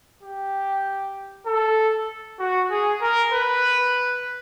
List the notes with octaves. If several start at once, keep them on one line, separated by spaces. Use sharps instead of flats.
G4
A4
F#4
G#4
A#4
B4